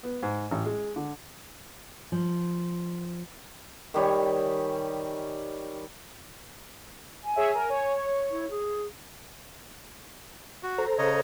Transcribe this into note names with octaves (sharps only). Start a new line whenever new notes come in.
B3
G#2
A1
G#3
D3
F3
D#3 G3 C#5 G#5
G#5
G#4 C#5 E5
A#4
C#5
E4
G#4
F#4
A4 C5 A#5
C#3 C#5 D#5